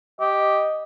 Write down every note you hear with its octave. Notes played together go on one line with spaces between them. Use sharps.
G4 D#5